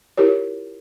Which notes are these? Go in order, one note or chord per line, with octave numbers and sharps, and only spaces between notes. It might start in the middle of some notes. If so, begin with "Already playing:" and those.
E4 F4 G4 A#4 C#5